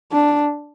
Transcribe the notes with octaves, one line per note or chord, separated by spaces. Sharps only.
D4